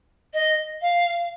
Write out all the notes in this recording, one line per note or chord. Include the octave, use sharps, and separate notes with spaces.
D#5
F5